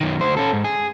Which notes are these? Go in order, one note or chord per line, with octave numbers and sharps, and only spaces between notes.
F#2 D#3
D2 C5
C#4 A4
G#2
G#4